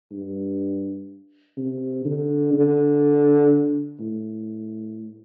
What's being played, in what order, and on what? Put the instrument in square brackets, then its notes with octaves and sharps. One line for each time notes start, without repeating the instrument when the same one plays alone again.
[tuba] G2
C3
D3
D3
A2